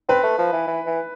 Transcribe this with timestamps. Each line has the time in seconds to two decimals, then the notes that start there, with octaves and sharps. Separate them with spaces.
0.09 C4 B4
0.23 A3
0.38 F3
0.52 E3
0.67 E3
0.86 E3